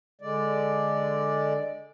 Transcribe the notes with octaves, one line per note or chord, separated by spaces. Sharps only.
D3 G#3 D5